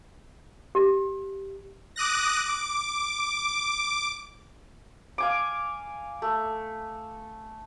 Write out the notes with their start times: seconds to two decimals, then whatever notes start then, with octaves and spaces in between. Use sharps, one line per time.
0.75 G4
1.96 D6 D#6 F#6 A#6
2.46 D6
5.18 F5 G#5 D6
6.22 A3